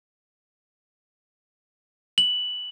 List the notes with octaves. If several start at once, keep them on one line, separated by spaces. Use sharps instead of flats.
F#7